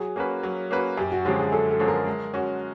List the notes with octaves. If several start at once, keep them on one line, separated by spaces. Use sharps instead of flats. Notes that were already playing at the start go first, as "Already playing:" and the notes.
Already playing: F#3 G#4
A#3 C#4 F#4 B4
F#3
A#3 C#4 F#4 B4
F#2 G4
F#4
D3 F3 G#3 C#4 G4
G#4
F#2 A4
A4
D3 F3 G#3 C#4
A#4
G#3
C#4 F#4